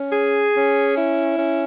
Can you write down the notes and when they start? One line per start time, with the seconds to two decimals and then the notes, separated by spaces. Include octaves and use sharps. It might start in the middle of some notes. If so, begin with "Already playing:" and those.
Already playing: C#4
0.13 G#4
0.55 C#4
0.97 E4
1.38 C#4